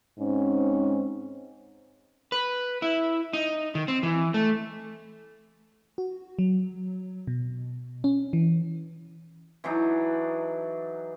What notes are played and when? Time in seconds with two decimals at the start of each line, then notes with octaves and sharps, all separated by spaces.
0.19 G#2 C4 C#4
2.32 B4
2.82 E4
3.33 D#4
3.75 D#3
3.88 C4
4.03 E3
4.34 A3
5.98 F#4
6.39 F#3
7.27 B2
8.04 C#4
8.33 E3
9.64 E3 F#3 D4 D#4